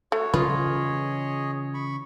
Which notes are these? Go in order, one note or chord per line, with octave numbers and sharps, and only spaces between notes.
A3 F#4 C#5
C#3 E3 G3 F4 G#4 B4 C#5 D#5
B5 C#6